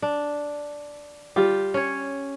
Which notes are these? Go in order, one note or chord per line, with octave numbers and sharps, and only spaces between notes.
D4
G3 F4 G4
C#4 C#5